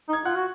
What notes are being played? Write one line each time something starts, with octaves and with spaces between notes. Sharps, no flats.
D#4
G#6
F4 F#5 F#6
F#4